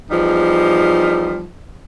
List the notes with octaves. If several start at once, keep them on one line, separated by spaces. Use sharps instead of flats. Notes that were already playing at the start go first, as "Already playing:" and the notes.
E2 F3 G3 D#4